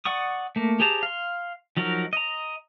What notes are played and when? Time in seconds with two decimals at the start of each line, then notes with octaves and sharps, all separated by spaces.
0.05 D5 F#5 C#6 D#6
0.56 A3 A#3
0.80 G4 G#4 C5 A5 A#5
1.03 F5 C6
1.77 F3 F#3 D#4 F#4 A#4
2.13 D#5 A#5